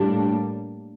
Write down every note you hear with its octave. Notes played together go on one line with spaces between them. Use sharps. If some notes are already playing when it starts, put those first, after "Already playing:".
Already playing: A2 G3 A#3 D4